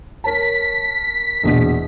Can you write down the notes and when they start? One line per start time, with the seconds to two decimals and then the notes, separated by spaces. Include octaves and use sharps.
0.24 A#4 C#5 A5 B6
1.44 A#1 E2 B2